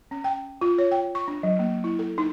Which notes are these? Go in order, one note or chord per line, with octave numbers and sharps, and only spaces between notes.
C#4
G5
F4
C#5
G5
C#6
D4
F#3
A#3
E4
A4
D#4